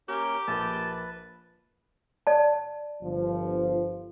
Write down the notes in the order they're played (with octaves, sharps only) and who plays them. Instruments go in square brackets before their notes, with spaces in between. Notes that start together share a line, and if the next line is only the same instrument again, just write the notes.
[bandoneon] A#3 C#4 A#4 [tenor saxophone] G4
[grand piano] A#1 A#3 [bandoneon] B4 [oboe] A5
[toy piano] D5 A5
[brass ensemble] G1 F3